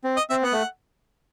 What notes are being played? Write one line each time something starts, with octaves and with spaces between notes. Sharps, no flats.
C4
D#5
C4 E5
B3 F#5
A3